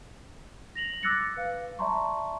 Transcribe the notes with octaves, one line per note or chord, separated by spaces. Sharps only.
A#6 F7 F#7
D6 E6 F#6 A6 A#6 C#7
B4 F5
D5 E5 A5 A#5 C6 C#6